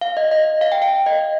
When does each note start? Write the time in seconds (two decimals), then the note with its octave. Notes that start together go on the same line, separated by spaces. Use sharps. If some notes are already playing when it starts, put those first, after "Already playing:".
0.01 F5
0.17 D#5
0.31 D#5
0.61 F5
0.72 G5
0.82 F5
1.06 D#5